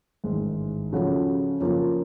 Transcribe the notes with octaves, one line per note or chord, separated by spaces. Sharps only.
A1 G#2 D#3
C#3 F3 A3 C#4 F#4
C#3 F3 A#3 C#4